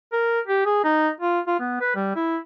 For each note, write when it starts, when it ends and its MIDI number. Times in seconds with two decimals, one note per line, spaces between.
0.12 0.40 70
0.47 0.61 67
0.65 0.84 68
0.84 1.10 63
1.20 1.40 65
1.47 1.59 65
1.60 1.76 59
1.81 1.95 71
1.95 2.11 55
2.15 2.37 64